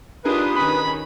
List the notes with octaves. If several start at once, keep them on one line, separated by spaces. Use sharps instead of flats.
D4 D#4 F4 G4 G#4 A#4 B4 D#6
D#3 C#4 B5